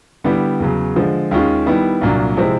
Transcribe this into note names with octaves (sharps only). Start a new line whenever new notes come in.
D3 G3 B3 E4 G4
E2 C#3 F#3
D3 F3 G#3
D#2 D#3 G#3 C#4 F4
D#3 G3 B3 E4
C2 A#2 F#3 A#3 D4
C3 F3 G#3 C4 E4